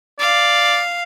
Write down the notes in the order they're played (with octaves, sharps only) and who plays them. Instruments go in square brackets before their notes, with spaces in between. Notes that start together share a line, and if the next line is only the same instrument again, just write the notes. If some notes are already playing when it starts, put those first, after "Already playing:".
[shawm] D5 [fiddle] F5